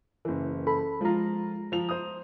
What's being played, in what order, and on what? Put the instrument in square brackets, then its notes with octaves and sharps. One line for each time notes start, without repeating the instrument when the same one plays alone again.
[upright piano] F#1 E3
[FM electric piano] A4 B5
[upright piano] F3 F4 [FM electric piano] G#3 A#5
[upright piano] F3 F7
C5 D#6